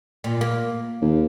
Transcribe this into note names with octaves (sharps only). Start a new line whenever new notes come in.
A#2
A#3
D#2